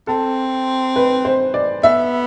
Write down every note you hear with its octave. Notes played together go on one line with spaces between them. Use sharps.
C4 A4
B4
C5
D5
B3 E5